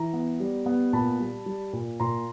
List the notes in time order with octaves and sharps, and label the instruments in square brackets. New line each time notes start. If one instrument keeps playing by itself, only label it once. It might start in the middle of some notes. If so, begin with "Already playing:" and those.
Already playing: [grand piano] E3 A#5
B3
G3
B3
A#2 A5 B5
G3
G3
A#2
A#2 A#5 C6